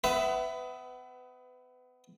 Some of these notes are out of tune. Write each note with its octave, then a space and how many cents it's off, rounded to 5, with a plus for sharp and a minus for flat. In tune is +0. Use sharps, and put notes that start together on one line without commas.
B3 +30 B4 +20 E5 +0